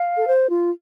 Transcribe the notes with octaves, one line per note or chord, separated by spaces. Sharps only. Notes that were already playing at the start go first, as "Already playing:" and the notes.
Already playing: F5
A4
C5
F4